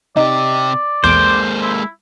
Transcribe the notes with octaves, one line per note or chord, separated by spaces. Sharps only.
C3 D#4 G4 D5
B1 E2 G#3 A#3 C5 D6
E4